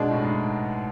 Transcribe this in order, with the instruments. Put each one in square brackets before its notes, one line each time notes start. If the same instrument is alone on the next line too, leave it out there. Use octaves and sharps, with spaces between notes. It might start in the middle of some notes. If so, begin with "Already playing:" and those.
Already playing: [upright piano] B2 G#3 D4
[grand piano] A2
G#2